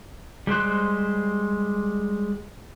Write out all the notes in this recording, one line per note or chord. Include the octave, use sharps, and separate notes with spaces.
G3 G#3 C5 F#6